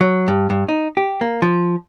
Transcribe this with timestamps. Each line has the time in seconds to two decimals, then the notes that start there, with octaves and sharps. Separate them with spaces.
0.01 F#3
0.28 G2
0.50 G2
0.68 D#4
0.97 G4
1.21 A#3
1.42 F3